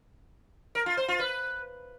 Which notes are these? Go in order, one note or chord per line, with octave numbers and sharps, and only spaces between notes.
A#4
F4
C5
F4
B4